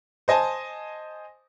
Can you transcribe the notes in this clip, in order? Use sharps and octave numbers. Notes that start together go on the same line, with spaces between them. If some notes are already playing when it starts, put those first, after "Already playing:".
C5 D#5 G#5 A5